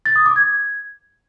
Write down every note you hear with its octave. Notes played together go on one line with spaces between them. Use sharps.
A6
D#6
D6
G#6